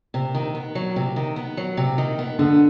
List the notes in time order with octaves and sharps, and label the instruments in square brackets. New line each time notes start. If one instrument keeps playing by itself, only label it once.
[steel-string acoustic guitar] C3
D#3
B3
F#3
C3
D#3
B3
F#3
C3
D#3
B3
[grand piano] D3 [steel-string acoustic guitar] B3